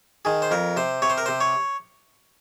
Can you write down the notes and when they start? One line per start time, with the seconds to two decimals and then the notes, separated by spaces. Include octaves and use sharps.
0.25 D#3 G#4
0.42 C5
0.51 F2 A#4
0.77 C3 C5
1.02 C3 C#5
1.10 C5
1.18 A#4
1.26 C3 C5
1.41 C#5